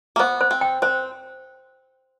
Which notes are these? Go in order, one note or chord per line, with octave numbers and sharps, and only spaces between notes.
A#3
B3 C5
C5
C4
G5
C4 C5